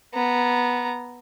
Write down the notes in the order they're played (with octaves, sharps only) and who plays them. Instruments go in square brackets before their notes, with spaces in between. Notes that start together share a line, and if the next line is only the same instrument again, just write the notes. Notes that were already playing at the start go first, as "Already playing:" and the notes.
[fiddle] B3 A#5